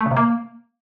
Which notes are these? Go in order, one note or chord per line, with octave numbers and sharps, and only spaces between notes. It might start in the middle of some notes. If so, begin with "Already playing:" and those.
A3
C#3
C3
A#3